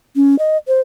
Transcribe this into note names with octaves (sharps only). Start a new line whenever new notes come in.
C#4
D#5
C5